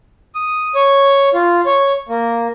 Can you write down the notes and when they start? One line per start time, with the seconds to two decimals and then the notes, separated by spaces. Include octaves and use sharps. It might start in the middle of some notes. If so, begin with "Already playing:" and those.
0.35 D#6
0.75 C#5
1.34 F4
1.66 C#5
2.09 A#3